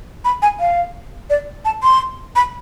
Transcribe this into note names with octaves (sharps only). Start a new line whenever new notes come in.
B5
G#5
F5
D5
A5
C6
B5